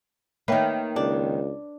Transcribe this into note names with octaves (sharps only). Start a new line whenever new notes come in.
D#3 A#3 B4 C#5 E5 G5
C#2 D4